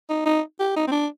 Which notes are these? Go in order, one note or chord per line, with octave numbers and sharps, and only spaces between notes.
D#4
D#4
G4
D#4
C4
D4